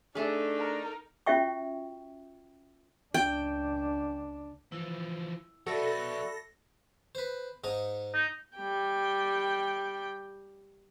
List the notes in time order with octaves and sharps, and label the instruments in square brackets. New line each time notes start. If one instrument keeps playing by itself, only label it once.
[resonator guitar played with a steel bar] A3 G#4 [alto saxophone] D4 [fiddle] D#4 A4
[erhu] A#4
[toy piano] C#4 F4 F#4 E5 G5 C#6
[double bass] C#2 D4 [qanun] G5
[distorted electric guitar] E3 F3 [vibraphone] E4
[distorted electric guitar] F#3 B3 [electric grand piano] F#4 [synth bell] A4 A#6 [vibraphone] D5 E5 B5
[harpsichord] B4 C5
G#2 D#4 D#5
[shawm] D#4
[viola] G3 G5